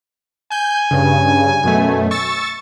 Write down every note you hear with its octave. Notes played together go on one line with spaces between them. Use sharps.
G#5 G6
G2 C#3
F#2 B2 A3
C#6 E6 A6